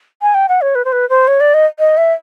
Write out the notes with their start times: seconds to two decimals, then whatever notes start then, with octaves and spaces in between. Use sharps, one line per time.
0.22 G#5
0.34 G5
0.49 F#5
0.61 C#5
0.75 B4
0.85 C5
0.92 B4
1.09 C5
1.28 C#5
1.40 D5
1.54 D#5
1.79 D#5
1.97 E5